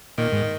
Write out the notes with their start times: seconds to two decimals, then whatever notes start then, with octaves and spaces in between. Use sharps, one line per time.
0.18 A#2 D#3
0.32 G#2